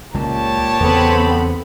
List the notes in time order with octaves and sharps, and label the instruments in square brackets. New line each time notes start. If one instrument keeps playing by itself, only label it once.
[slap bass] C#2 G#3 [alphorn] A#2 [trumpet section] G4 C#5 A5
[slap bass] E2 C#3 [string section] B3 C4 B5 [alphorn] A4